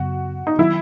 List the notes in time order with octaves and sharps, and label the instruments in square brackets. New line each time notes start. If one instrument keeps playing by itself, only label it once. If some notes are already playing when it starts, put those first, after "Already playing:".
Already playing: [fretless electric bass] F#2 C#3 F#3 B3 [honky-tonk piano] F#4
[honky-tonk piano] D#4
[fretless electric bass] D#3 F#3 [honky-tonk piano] E4